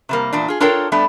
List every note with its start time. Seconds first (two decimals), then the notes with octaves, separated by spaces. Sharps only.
0.09 C3 G3 A#3
0.33 E2 A#2 D4
0.48 F4 G#4
0.60 D4 F4 A4 A#4 C#5 G5
0.92 G3 A3 B3 D4